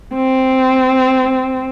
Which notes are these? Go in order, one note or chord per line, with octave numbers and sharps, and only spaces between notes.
C4